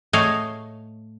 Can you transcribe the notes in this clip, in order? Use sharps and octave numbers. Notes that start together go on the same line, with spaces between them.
A2 A3 C#5 D#5 F5 G#5